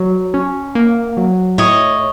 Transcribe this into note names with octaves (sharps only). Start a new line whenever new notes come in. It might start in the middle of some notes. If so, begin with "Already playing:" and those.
Already playing: F#3
C#4
A#3
F#3
A2 C#5 D#5